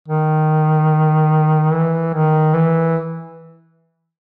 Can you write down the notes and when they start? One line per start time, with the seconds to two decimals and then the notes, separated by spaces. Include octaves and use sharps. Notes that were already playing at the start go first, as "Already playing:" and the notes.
0.08 D#3
1.73 E3
2.14 D#3
2.55 E3